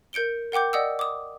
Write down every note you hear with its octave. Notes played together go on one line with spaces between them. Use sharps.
A#4 G6 C#7 D7 G7
A#4 F#5 G5 D6 G6
D5 D#5 F#5 D#6 E6
D6 D#6